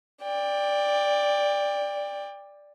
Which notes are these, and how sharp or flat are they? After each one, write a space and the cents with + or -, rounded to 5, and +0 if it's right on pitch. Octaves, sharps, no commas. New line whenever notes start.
D5 +0 G5 +25